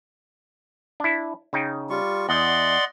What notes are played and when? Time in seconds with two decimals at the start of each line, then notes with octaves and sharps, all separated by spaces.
1.00 D4 E4
1.53 C#3 D#4 G5
1.90 G3 F4 C#6
2.29 E2 D5 D#5 F#5 C6